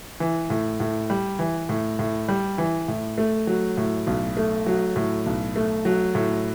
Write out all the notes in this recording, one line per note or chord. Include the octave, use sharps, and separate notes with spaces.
E3
A2
A2
G3
E3
A2
A2
G3
E3
A2
A3
F#3
A2
B1
A3
F#3
A2
B1
A3
F#3
A2